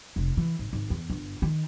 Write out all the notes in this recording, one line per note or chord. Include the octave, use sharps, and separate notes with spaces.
F1
E3
G#1
G#1
E2
G1
D#3